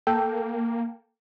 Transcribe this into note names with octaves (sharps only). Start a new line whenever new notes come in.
A#3 A4 G5